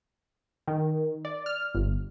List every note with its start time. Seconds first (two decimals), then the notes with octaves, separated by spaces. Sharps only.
0.67 D#3
1.25 D5
1.46 F6
1.75 G1